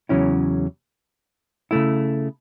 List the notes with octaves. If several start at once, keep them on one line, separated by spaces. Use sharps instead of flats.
E2 C#3 F#3 C#4 E4
C#3 A3 E4